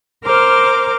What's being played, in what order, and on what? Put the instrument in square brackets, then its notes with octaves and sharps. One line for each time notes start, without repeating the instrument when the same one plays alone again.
[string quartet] A#4 C5 D6 F6